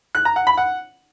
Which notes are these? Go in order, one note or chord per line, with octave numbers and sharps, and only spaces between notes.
F#6
A#5
F#5
B5
F#5